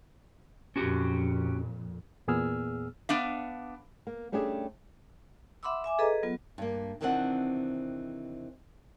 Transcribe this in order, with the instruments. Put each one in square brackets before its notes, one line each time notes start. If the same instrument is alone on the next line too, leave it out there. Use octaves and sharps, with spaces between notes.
[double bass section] F2 A#2 [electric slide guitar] C#4 F#4 G4
[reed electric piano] E2 A#2 B3 G#4 E6 F6
[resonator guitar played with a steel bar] B3 D4 F5
[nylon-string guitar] A#3
G3 A3 C#4 D4 G4 G#4
[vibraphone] E5 F#5 B5 C6 D6 E6
E5 G#5 D6
G#4 A4 B4 D#5 A#5
F#3 B3 F4
[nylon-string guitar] G2 A#3
C3 D#3 E3 C4 D4 F#5